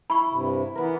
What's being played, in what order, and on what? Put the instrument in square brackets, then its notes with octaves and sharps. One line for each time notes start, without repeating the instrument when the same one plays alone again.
[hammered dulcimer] E4 [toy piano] B5 C#6
[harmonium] G2 C3
[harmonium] E3 B3 [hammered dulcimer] A#4 B4